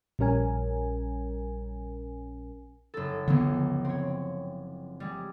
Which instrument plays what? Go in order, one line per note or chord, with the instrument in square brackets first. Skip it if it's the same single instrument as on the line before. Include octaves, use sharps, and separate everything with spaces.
[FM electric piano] A#1 G3 C#4 A#4 G#5
[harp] F#1 A4
[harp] F#1 C#2 F3 [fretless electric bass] D3 B3
[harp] C4 C#5
G3 G#3